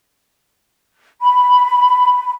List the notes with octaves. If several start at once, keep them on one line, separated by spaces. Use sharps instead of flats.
B5